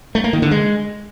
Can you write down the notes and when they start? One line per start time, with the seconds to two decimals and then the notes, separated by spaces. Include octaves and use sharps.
0.15 A3
0.24 A#3
0.33 D#3
0.42 D3
0.51 G#3